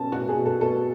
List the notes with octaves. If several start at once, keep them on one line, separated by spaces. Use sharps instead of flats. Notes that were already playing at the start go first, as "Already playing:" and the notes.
Already playing: B2 C#4 A5
B2 F#4
G#4
B2
A4
B2 A4